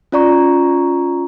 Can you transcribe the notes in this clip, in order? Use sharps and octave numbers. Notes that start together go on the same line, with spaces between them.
C#4 F4 D5 A#5 C#6